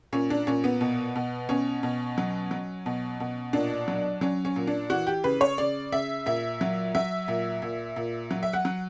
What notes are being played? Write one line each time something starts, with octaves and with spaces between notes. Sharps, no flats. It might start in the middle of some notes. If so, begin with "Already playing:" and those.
A#2 C#4
D4
A#2 C#4
B3
B2
B2
B2 C#4
B2
F#3
F#3
B2
B2
A#2 D4
F#3
F#3 C#4
C#4
A#2
D4
E3 F#4
G4
C#3 B4
C#5
C#3 D5
C#3 E5
A#2 E5
F#3
F#3 E5
A#2
A#2
A#2
F#3
E5
F#5
F#3